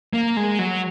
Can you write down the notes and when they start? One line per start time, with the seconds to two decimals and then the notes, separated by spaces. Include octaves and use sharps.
0.13 A#3
0.37 G#3
0.59 F#3